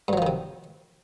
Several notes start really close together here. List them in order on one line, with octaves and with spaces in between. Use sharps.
G2 F#3 F3 D#3 C3